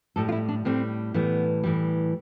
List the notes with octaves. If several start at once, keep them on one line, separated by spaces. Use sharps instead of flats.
A2 G3 A4
F4
E4
D4
A2 G3 C4
A2 E3 G3 B3
A2 E3 G3